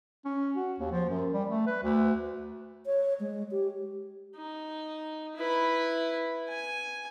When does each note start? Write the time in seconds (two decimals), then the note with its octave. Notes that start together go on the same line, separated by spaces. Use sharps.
0.25 C#4
0.56 F#4
0.79 D#2
0.91 F3
1.09 F#2
1.34 G3
1.49 A3
1.67 B4
1.83 D2
2.86 C#5
3.20 G#3
3.51 G4
4.36 D#4
5.36 E4 B4
6.49 G#5